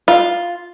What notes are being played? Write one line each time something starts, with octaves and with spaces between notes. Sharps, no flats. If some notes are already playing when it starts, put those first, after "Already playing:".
F4